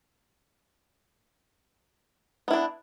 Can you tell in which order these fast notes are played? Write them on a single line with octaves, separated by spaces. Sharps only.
B3 E4 D4